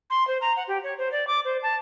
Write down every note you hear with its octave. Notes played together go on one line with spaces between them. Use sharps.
C6
C5
A#5
F#5
G4
C#5
C5
D5
D6
C5
A5